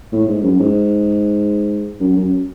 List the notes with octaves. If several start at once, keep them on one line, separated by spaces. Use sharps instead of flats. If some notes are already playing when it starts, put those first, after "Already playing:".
A2
G#2
F#2
G#2
F#2
F#2